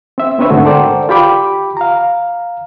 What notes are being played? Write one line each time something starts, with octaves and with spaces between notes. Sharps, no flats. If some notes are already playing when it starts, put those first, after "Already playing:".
C4 E5
B3 C4 D4 B4 C#5 E5
G#2 D3 A3 F#4
A4 A#4 C5 D5 F#5 G5
F4 G4 G5 B5 D6
F5 A#5